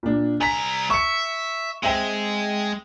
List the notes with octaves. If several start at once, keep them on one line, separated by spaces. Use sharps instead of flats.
A#2 D4
C2 G#5 A#5 B6
E5 C#6 C#7
G#3 C4 E5 G5